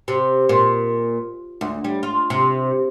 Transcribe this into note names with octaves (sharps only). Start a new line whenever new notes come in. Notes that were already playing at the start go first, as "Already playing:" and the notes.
C3
A#2
D2
G3
F4
C3